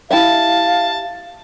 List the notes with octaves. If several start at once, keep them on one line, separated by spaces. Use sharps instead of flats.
E4 G4 E5 F5 A5